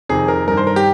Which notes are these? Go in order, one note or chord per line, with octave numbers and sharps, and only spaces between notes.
F2 C3 D#3 G#4
A#4
G2 D#3 A#4
C5
A#4
G4